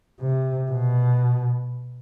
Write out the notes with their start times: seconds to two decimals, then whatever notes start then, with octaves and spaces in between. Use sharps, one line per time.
0.21 C3
0.71 B2